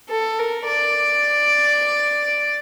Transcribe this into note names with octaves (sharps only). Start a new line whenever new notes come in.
A4
A#4
D5